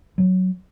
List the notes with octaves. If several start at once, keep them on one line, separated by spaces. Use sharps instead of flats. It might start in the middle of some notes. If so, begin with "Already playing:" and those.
F#3